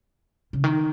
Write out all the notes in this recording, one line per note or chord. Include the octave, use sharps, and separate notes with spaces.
C#3
D#3